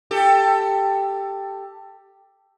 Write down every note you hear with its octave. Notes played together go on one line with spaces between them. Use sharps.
G4 A4